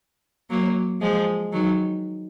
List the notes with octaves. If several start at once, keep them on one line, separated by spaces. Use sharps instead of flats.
F#3 A#3
F3 G#3
D#3 F#3